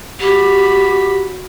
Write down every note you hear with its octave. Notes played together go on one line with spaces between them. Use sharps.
F#4 G4 B5